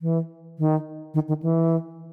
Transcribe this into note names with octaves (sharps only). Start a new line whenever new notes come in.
E3
D#3
D#3
D#3
E3